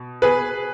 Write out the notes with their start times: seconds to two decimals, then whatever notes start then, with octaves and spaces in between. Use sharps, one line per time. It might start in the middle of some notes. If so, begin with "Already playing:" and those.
Already playing: B2
0.22 G#4 B4